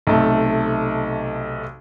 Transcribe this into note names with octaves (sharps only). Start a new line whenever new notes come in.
B1 C3 A3